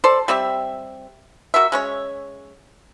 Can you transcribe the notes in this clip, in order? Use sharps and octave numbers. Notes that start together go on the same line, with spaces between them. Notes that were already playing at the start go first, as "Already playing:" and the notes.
A4 C5 D5
G3 C4 G4 E5
F#4 A#4 E5
G#3 C#4 C#5